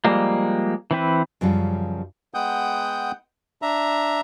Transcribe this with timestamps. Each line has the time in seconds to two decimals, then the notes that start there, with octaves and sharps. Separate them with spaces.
0.05 F3 G3 G#3 A#3
0.91 E3 C4 B4
1.41 F#2 C#3 F3 G3
2.34 G#3 B3 F#5 G5 D#6 G6
3.62 D4 E5 A#5